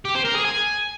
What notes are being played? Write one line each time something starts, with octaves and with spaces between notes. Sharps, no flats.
G4
C5
A#4
G#4
G#5